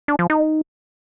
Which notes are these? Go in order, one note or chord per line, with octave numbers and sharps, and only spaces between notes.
D4
F3
D#4